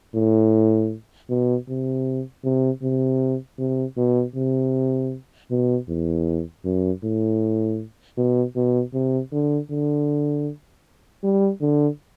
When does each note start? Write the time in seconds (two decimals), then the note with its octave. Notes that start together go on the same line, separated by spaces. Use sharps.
0.15 A2
1.29 B2
1.69 C3
2.44 C3
2.83 C3
3.59 C3
3.97 B2
4.36 C3
5.51 B2
5.88 E2
6.65 F#2
7.04 A2
8.17 B2
8.56 B2
8.94 C3
9.32 D3
9.70 D3
11.24 G3
11.61 D3